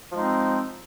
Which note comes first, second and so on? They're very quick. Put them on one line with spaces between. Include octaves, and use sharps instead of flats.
F3 G#3 D#4 C4